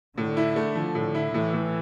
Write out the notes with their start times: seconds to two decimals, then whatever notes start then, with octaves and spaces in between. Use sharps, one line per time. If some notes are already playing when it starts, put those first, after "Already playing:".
0.17 A2 D3
0.37 E4
0.56 A3
0.75 F3
0.95 A2
1.15 E4
1.34 A2 E3
1.53 A2